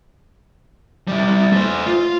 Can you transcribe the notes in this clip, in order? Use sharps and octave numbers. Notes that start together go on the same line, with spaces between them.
G3 E4
A3 C5
F4